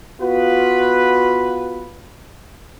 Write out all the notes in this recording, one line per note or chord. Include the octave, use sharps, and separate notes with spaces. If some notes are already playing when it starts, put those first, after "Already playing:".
B3 F4 F#4 B4